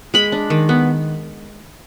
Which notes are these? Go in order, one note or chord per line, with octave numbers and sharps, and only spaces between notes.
G#3 B5
D4
D#3
B3